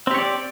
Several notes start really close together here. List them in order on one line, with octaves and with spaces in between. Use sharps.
C4 G4 C#5 D5